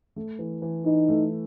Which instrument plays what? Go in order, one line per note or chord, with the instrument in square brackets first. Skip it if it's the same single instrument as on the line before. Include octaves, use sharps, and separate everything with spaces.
[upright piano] A3
E3
E3
[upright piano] E3 [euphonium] D#4
[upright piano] A3